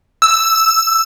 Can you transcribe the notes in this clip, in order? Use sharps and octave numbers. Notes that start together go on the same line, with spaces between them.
E6